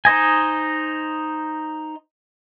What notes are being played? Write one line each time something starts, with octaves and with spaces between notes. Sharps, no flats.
D#4 C5 D#5 G#5